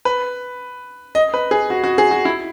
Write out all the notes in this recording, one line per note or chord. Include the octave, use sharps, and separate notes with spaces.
B4
D#5
B4
G#4
F#4
F#4
G#4
F#4
E4